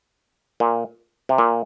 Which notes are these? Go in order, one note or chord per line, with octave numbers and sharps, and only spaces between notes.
A#2
C3
A#2